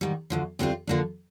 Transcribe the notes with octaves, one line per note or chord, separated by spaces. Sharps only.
G#2 D#3 G3
D2 D3 F3
D2 D3 G3 C4 F4
D3 F3 A#3 D4